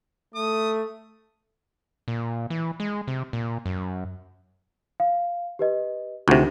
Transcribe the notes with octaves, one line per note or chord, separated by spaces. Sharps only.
A3 D#6
A#2
E3
G#3
C3
A#2
F#2
F5
G4 B4 D#5
D2 C3 D#4 F4 F#5